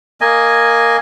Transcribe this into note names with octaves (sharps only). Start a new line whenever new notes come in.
A#3 D#5 G#5